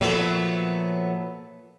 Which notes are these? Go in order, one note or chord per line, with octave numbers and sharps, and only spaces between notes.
A#2 F3 F#3 A3 B3